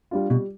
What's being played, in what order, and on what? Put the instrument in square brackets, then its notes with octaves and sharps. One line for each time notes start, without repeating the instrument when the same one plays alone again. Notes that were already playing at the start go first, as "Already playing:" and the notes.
[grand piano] G3 D4 F4
[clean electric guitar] B2 [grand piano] G3